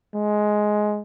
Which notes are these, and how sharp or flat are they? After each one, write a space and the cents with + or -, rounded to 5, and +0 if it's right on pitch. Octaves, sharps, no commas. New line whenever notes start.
G#3 +10